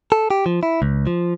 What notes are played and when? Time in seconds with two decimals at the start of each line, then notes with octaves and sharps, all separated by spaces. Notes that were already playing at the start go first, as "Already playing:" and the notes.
0.12 A4
0.31 G4
0.46 F3
0.63 E4
0.82 C#2
1.07 F3